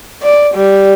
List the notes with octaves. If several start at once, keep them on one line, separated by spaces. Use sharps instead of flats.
D5
G3